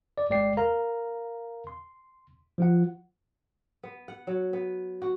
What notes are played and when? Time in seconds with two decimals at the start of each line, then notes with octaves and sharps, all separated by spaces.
0.18 D5
0.30 G#1 G#3 D5 G5 C7
0.57 A#4 F5 A#5
1.67 C6
2.58 F3 F4 F#5
3.83 B3
4.08 F#5
4.27 F#3
4.53 B3
5.02 F#4